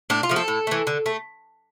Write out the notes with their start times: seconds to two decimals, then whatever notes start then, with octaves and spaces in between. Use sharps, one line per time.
0.10 A2 D4
0.23 F4
0.29 F3 A3
0.36 A4
0.48 A2
0.67 E3 A3
0.87 D3
1.06 A3